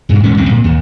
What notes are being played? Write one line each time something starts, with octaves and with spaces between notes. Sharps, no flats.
G2 B2
D#1 D2 G#2 C#4
E1 C2 C4
A#2
D#2